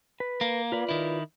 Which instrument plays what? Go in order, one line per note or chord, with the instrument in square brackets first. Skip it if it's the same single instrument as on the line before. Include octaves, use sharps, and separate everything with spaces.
[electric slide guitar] B4
[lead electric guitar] A#3
[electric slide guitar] F4 B4 D5
[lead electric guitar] D#3 E4